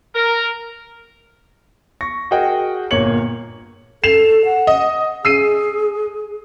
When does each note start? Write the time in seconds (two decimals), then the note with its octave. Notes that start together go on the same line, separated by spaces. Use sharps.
0.15 A#4
2.01 C#6 A#6
2.31 F#4 G#4 A#4 D#5 F#5 G5
2.91 G1 A#2 A#3 C#5 C#7 F#7
4.04 A4 C7 E7 F7
4.45 F#5
4.67 D#5
5.25 G#4 E6 C7 D#7